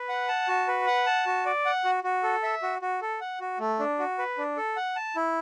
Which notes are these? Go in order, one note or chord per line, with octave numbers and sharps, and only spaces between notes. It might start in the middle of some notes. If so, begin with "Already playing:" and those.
Already playing: B4
F#5
A5
F#4
B4
F#5
A5
F#4
D5
F#5
F#4
F#4
A4
E5
F#4
F#4
A4
F#5
F#4
A3
D4
F#4
B4
D4
A4
F#5
A5
E4